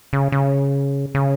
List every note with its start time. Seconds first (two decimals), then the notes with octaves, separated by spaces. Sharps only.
0.13 C#3
0.32 C#3
1.15 C#3